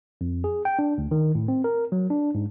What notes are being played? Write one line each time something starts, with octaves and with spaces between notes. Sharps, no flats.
F2
G#4
G5
D4
D2
D#3
A2
C4
A#4
F#3
D4
G#2